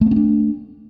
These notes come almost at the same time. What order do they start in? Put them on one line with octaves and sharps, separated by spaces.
A3 B3 C#4 D4